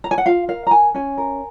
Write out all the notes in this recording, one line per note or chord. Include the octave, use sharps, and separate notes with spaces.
A#5
G#5
F#5
F4 F5
A#4 F5
A#5
A#4 G#5
C#4 G#5
A#4